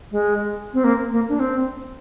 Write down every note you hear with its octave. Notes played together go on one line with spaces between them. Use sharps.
G#3
C4
A#3
A#3
D4
C4